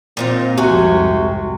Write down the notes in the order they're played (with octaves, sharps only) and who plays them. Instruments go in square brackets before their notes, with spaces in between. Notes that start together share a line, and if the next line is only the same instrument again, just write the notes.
[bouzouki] A#2 D#4 F4 [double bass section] C4
[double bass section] C2 F2 G#2 [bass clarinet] C3 [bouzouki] F#4 G#5